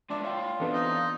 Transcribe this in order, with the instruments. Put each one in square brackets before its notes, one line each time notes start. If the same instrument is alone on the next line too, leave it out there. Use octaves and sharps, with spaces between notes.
[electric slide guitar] G#3 F4 E5 [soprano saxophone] D4
[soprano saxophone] F4 [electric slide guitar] C#5 G5
[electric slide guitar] E3 C4 [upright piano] B3 D4 A4
[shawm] D#4